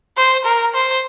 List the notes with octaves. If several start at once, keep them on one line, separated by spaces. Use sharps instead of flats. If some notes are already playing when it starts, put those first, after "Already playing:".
C5
A#4
C5